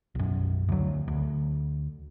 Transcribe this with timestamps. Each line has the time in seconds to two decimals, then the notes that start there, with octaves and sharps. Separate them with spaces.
0.15 B1 F#2
0.69 D2 F#3
1.08 D2